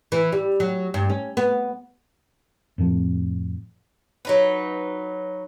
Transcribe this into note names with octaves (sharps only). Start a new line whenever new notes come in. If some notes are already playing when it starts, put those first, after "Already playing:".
E3
G3
F#3
G2
C#4
B3
F2 A2 F3
F#3 D#4 B4